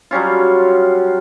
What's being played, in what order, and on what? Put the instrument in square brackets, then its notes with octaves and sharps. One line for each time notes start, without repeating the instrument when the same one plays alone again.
[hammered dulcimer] F#3 G3 C#4 F4